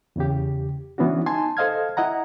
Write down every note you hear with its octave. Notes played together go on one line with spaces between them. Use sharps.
E2 C#3 G4
E3 B3 C#4 D4 F#4
D#4 G#5 A5 C6
A4 C5 D#5 F5 F6 G#6
E4 D#5 F#5 A#5